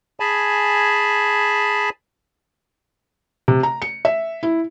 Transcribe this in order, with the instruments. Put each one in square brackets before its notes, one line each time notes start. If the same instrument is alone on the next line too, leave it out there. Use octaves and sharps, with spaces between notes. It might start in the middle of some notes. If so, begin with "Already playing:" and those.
[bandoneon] G#4 G#5 A5 B5
[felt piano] C3
A#5
C#7
E5
E4